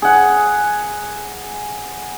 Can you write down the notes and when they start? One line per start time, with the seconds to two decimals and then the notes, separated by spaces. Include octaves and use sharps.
0.02 G#4 F#5